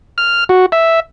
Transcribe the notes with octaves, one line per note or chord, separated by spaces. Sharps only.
F6
F#4
E5